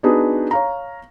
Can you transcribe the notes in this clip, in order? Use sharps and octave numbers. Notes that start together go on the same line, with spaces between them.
B3 D4 D#4 F#4 G#4 B4
C#5 F5 A#5